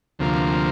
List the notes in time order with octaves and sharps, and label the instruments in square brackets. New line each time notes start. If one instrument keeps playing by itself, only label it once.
[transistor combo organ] D2 C3 F3 A#3